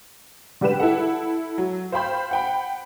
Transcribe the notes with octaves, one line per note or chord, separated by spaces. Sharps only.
D3 G3 G4 B4 E7
E4 A4 F#5
F#3
C5 F5 G5 B5 C6 G6
F#5 G5 B5